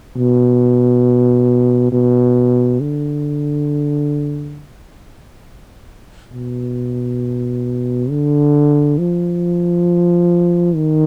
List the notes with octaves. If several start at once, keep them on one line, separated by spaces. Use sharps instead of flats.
B2
B2
D3
B2
D3
F3
D#3